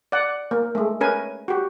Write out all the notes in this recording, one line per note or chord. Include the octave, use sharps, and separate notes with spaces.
D5 F#5
A#3
G#3 A3
C#4 A#4 B4 G#5
F#4 G4